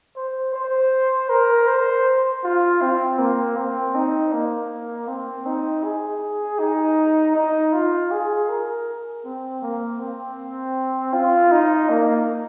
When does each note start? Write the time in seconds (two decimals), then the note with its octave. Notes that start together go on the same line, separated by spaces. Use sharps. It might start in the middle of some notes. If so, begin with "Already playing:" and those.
0.17 C5
0.54 C5
1.30 A#4
1.68 C5
2.44 F4
2.81 C4
3.19 A#3
3.57 C4
3.95 D#4
4.33 A#3
5.08 C4
5.46 D#4
5.84 G#4
6.59 D#4
7.35 D#4
7.73 F4
8.11 G#4
8.49 A#4
9.25 C4
9.62 A#3
10.00 C4
11.14 F4
11.52 D#4
11.89 A#3